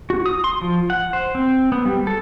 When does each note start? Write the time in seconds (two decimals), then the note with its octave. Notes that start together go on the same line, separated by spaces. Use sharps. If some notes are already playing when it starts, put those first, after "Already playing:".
0.10 F#4
0.26 D#6
0.44 C6
0.61 F3
0.90 F#5
1.13 C5
1.35 C4
1.72 B3
1.86 G3
2.07 A4